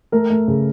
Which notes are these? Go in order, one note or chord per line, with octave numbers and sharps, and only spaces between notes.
A3 A#4
A3
C#3